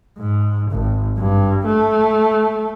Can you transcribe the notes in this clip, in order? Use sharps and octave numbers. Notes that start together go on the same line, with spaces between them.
G#2
G#1
G2
A3